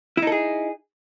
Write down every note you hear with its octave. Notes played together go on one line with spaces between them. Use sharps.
D#4 E4 G#4 A4